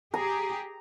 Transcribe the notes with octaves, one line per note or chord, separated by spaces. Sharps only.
G4 G#4 A#5